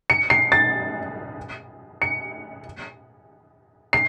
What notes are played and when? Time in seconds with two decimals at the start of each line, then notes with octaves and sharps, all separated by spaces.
0.10 C#7
0.30 C7
0.52 A6
2.02 C#7
3.93 C7